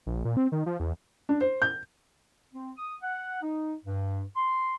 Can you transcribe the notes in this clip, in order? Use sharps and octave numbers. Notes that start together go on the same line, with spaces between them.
A#1
A#2
C4
D#3
F3
E2
D4
C5
G6
C4
D#6
F#5
D#4
G2
C6